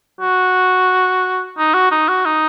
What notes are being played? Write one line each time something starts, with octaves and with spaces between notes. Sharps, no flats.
F#4
D#4
F#4
D#4
F#4
D#4